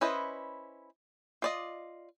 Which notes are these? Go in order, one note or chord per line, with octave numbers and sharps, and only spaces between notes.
C#4 E4 B4 C5 D#5
F4 D5 D#5